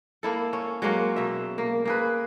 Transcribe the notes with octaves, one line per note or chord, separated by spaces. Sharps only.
A#3 E4 A4
C#4
F#3 G#3 A#3 C#4
B2 E5
A#3
A#3 G#4 B4